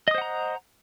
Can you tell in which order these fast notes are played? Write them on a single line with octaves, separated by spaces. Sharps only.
D#5 D#6 C5 F#5 A#5